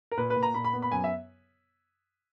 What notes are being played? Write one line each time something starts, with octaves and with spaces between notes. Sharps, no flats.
A#4
A#2 B4
B4
A#2
A#5
A#2 B5
B5
B3
B5
F#2 G#5
E5